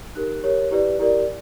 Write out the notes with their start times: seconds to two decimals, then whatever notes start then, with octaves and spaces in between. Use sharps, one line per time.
0.15 D#4 G4 A#4 F#6
0.44 G4 A#4 C#5
0.71 E4 G4 B4 D5
0.99 E4 G4 A#4 D5